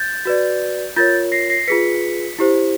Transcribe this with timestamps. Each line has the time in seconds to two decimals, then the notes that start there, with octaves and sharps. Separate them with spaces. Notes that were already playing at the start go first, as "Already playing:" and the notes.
Already playing: G6 A6
0.25 F#4 B4 D5
0.96 F4 A#4 C#5 G6 A6
1.32 A#6 C7
1.50 A#6 C7
1.67 F4 G#4 B4 B6 C#7
2.39 E4 G4 C5